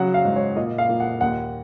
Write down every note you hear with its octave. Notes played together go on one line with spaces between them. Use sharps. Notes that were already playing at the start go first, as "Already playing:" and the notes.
Already playing: C#3 F#3 F#5
F5
G#2
C#5
A#2 D#5
F5
A#2
F#5
D#2 F#5